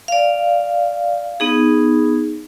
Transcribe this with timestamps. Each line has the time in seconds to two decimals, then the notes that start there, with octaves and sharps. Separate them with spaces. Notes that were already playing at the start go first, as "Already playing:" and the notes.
0.08 D5 F5
1.40 B3 D#4 G#4